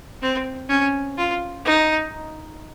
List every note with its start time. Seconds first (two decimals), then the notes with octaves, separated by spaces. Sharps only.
0.22 C4
0.69 C#4
1.18 F4
1.65 D#4